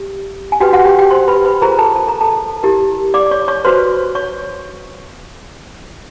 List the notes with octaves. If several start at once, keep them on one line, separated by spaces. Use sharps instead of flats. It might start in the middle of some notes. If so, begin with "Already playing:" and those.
Already playing: G4
G#5
F#4 G4 B4 G5
F#4 F#5
G4 G5
G4 G5
C5 C6
B4 B5
B4 B5
F4 G#4 A#4 C5 A#5
A4 A5
A5
A#5
A4 A5
E4 G4 A#4
D5 D6
C#5 C#6
C#5 C#6
F#4 B4 C5 C6
C#5 C#6